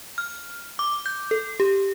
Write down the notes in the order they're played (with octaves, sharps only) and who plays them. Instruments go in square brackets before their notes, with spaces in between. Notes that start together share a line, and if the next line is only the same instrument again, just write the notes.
[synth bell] F6
D6
G6
A4
G4